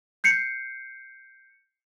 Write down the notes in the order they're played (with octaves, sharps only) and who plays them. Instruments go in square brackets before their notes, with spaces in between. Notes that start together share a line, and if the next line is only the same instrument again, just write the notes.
[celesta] G6 C7 C#7